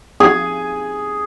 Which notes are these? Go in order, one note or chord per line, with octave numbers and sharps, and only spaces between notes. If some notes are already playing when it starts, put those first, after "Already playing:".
G#4